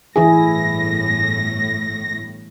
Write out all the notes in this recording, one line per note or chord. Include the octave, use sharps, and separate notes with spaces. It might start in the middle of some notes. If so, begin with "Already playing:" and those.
G1 A2 E3 E4 G#4 A#6